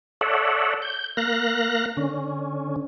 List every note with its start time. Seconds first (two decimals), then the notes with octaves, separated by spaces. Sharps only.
0.21 A4 C#5 D5 E5 F#5
0.82 G6
1.17 A#3 F5 F#6 A#6
1.97 D3 C#4